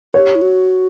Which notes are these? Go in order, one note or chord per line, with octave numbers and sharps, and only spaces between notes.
G4 C#5
E4
F#4